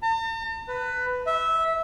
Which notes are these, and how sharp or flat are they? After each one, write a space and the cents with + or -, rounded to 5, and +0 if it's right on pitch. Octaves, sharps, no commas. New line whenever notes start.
A5 +45
B4 +10
E5 -15